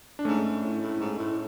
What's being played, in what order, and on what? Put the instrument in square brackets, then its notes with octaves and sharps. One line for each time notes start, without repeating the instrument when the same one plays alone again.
[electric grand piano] D4
[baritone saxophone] G#2 [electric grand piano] A3 C#4
[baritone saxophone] A2
A2
G#2
A2